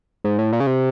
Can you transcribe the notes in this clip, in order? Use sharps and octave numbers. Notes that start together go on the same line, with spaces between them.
G#2
A2
A#2
C#3
C3